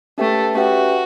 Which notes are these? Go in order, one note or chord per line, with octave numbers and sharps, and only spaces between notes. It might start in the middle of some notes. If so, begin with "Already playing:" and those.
A3 C#4 G4 B4 E5 G5
C#4 F#4 G4 B4 E5 G5